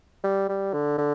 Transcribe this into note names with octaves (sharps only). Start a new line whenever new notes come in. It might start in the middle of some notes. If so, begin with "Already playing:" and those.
G3
G3
D3
D3